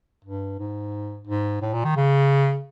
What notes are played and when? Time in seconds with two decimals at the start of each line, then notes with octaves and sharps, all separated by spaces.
0.25 G2
0.60 G#2
1.27 G#2
1.62 A2
1.74 A#2
1.85 D#3
1.96 C#3